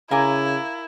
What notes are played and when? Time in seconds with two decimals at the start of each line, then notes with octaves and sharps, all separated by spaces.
0.11 C#3 E4 A#4 F5 G#5 A#5 D6 G#6